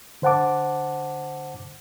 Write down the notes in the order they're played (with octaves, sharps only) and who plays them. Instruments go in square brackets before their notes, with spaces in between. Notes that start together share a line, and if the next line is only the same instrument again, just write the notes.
[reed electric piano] D3 C5 F#5 A5 D6